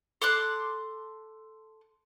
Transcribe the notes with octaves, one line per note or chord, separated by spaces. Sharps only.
A4 C6 D6 F#6